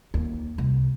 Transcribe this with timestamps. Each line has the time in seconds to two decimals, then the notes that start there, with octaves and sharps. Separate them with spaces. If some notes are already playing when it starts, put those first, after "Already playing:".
0.14 D#2
0.58 C2